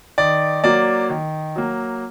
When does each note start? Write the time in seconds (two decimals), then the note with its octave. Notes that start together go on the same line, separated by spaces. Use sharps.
0.18 D#3 D5
0.64 F#3 A#3 D5
1.10 D#3
1.56 F#3 A#3